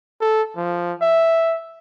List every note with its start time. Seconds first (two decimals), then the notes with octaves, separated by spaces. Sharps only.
0.21 A4
0.56 F3
1.02 E5